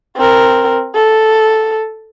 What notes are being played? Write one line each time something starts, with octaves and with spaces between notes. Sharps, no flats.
C4 A#4
A4